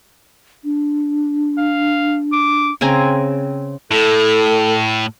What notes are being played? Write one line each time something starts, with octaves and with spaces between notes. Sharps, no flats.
D4
F5
D6
C#3 C4 G#5 A#5
A2 A4